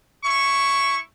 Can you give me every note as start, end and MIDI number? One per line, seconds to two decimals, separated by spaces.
0.24 0.98 64
0.24 0.98 85